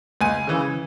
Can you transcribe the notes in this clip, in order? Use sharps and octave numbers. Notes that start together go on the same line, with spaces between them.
C#2 G#5
C#3 E3